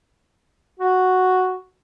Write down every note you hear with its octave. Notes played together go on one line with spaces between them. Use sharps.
F#4